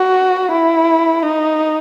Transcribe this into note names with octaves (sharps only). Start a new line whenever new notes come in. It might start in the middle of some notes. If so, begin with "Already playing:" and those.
Already playing: F#4
E4
D#4